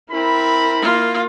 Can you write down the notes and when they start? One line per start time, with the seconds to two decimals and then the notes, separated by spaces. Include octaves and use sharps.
0.10 C4 E4 A#4 B5
0.82 A#3 F4